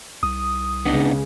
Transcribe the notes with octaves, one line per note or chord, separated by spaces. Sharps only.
C2 D#6
C#2 C#3 B3 D4 D#4